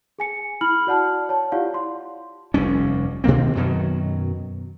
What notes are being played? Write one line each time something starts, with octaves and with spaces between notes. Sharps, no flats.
G#4 G#5 C#7
E4 B5 F6 F#7
F#4 D5 F#5 A5 F6
C#5 A5
E4 F4 G4 D5 F5 F#5
C6
F1 D#2 G3 C#4
B2 D#3 A#3 C4
F#2 B2 D#3 F#3